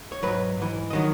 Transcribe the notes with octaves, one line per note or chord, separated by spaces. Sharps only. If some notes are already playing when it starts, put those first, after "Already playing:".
C#5
G#2 F#3 B4
G#2 E3
D#3 F#3 D#5